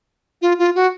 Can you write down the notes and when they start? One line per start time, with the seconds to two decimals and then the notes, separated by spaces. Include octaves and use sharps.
0.42 F4
0.59 F4
0.75 F#4